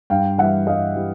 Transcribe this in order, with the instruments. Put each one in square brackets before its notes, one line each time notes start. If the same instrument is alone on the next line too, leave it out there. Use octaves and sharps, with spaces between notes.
[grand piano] G2 F5 G5
E3 G3 E5 F#5
G2 D#5 F5
E3 G3